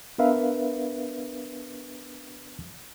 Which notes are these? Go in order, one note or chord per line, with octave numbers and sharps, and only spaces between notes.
B3 D4 A#4 B4 E5 F5